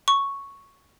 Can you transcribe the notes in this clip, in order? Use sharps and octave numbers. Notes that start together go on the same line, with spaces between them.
C#6